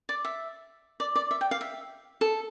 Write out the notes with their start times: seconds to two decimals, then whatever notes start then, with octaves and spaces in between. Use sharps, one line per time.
0.09 D5
0.25 E5
1.00 D5
1.16 D5
1.31 E5
1.41 G5
1.51 F5
1.61 E5
2.21 A4